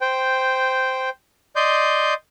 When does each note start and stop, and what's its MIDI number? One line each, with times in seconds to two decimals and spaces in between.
0.01 1.09 72
0.01 1.09 79
1.56 2.14 74
1.56 2.14 75
1.56 2.14 84
1.56 2.14 91